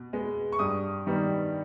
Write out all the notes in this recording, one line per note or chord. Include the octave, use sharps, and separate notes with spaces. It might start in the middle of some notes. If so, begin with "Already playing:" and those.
Already playing: B2
G#3 B3
C#6
G2 D#6
D#3 G3 B3